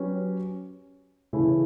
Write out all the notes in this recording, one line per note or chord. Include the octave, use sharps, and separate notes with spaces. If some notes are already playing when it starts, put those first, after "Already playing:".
Already playing: F#3 C#4 G4 B4
C#3 E3 A3 E4